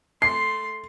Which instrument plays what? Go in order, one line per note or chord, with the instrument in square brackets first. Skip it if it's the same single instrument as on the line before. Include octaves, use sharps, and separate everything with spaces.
[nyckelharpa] A3 C6 [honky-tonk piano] C7